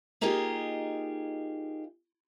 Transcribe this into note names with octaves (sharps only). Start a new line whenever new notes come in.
A#3 D#4 F4 G4 G#4 D#5